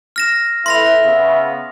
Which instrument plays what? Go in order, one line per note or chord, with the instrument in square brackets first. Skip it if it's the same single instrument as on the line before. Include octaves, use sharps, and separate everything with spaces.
[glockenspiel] F6 A#6 E7
[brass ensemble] E4 A4 B4 [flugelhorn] E5 [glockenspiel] C6 A#6 F7
[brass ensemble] C#3 B3